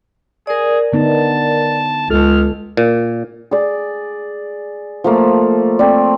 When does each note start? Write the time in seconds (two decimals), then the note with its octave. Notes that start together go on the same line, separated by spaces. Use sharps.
0.47 G#4 A#4 D5
0.93 D3 B3 D#4 A5
2.11 C#2 A4 F6
2.77 A#2
3.51 G#4 D5
5.04 F3 A3 A#3
5.79 C4 D5